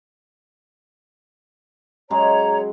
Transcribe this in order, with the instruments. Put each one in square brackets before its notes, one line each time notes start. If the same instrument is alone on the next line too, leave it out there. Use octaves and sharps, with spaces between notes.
[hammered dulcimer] C#3 F#3 G#3 [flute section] C#5 A#5